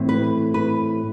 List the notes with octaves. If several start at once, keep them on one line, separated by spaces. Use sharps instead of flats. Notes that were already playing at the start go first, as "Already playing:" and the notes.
Already playing: A2 E3 A3 C4
B4
B4